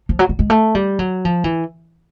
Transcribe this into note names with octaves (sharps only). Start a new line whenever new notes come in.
F3
F#3
G3
G#3
A3
G3
F#3
F3
E3